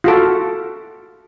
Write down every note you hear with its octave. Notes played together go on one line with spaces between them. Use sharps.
F4 F#4 A4